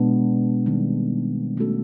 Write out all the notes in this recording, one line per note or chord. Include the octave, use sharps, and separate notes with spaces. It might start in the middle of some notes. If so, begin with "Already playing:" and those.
Already playing: B2 G#3 B3 D4
D#3 G3 C4
A3 C#4 F#4 A4